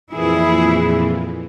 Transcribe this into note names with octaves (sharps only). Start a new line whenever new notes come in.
F2 A#2 E3 E4 G#4